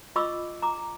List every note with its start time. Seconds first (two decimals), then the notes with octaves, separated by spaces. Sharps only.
0.16 F4 D#5 B5 C#6 D6 E6
0.62 A#5 D6